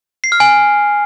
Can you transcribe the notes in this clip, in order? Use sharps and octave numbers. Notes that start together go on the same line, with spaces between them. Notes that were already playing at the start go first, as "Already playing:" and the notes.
C7
F6
G#5